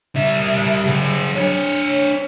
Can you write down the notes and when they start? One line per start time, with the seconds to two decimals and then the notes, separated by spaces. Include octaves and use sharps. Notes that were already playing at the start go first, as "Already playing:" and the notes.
0.16 G3 E5
0.87 F#3 G#4
1.35 D4 C#5